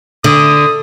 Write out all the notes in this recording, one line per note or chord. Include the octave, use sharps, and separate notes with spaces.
D3 D#6